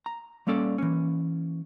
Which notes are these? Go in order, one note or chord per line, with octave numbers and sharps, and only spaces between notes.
A#5
G3 A#3 C#4 A4 D5
E3 A#3 C#4